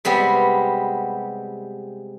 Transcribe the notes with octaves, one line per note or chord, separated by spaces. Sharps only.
C3 G3 G#3 B3